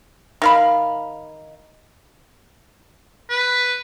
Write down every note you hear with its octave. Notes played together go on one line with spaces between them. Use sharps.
D#3 F5 B5
B4